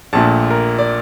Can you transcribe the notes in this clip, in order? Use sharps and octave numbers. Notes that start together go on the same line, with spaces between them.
A#1 A#2 A3 A5
A#4
D5